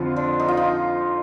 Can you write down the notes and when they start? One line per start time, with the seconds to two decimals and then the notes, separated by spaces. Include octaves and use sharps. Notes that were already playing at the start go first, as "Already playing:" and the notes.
Already playing: F2 D3 F3 C4 F4
0.16 D4
0.40 D#4
0.48 F4
0.57 D#4